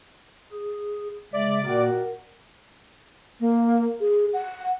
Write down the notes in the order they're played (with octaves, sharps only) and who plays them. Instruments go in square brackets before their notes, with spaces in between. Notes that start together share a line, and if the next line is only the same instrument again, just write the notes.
[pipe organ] G#4
[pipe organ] C#3 G#3 E5 [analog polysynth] D5
[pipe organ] A#2 A#3 [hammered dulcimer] D#3 A#4 [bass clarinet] F#4
[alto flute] A#3
G#4
F#5